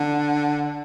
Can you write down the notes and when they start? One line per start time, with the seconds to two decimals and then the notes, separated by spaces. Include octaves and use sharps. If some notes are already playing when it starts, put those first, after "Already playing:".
Already playing: D3